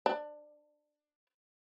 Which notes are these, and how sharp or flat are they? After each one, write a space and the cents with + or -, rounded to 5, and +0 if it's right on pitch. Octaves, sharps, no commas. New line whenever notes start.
D4 +20